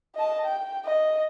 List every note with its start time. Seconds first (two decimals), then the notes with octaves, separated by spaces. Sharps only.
0.15 D#5 A5
0.45 G5
0.85 D#5